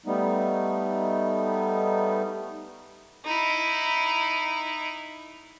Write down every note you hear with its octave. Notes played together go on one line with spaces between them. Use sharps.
G3 A3 B3 D#4
D#4 E4